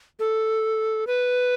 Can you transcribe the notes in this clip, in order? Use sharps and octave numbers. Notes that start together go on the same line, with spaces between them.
A4
B4